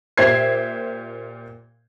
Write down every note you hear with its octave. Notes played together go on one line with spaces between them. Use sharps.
A#2 G4 C5 E5 G#6 C7